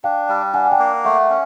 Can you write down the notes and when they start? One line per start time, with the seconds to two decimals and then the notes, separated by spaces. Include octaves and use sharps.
0.04 D4 F5 G5
0.29 G3
0.54 D4 F#5 G#5
0.71 G5 A5
0.79 A#3
1.04 A3 E5 F#5
1.30 C#4